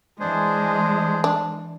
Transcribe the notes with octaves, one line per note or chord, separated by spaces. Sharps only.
E3 G#3 D4 G#4 C5
D4